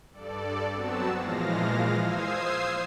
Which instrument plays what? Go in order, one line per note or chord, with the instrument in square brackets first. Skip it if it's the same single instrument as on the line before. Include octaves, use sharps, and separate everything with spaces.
[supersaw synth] G2 A4 D5
F#3 B3 C4 F#4 A5 E6
A#2 E3 F3 G#3 F5 A#6
C5 F5 D#6 E6 G#6 C7